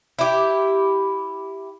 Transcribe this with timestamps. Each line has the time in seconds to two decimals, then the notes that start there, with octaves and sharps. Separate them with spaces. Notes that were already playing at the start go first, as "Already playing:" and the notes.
0.19 E4 G4